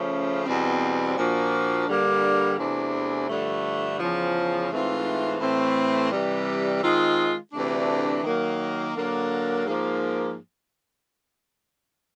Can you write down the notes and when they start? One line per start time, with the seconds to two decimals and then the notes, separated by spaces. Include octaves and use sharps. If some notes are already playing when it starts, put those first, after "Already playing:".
Already playing: C#3 F3 A3 C#4
0.46 E2 B2 G3 C4
1.16 A#2 F3 A#3 D4 F#4
1.87 G2 D3 G3 A#3
2.57 E2 C3 E3 A3 D4
3.28 G2 D3 F3 A3
3.99 E2 C#3 F3
4.70 G#2 E3 A3 C4 F4
5.40 A2 E3 A3 C4
6.12 C3 E3 G3
6.82 D#3 G#3 C4 F4
7.53 D2 C3 E3 A3 D4
8.24 D#3 F#3 A#3
8.95 D3 F#3 A#3
9.65 G#2 F3 A#3